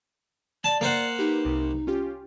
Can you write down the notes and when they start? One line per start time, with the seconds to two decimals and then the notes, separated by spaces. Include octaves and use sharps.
0.64 D5 A5
0.81 A#3 C5 F#5
1.19 D#4 G4 B4
1.45 C2 C3
1.87 C#4 F4 G4